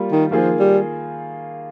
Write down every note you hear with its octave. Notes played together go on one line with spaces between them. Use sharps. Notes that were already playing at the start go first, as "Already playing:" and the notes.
Already playing: G3 A#3 F4
D#3
D#3 F3 A#3 F4 G#4
G3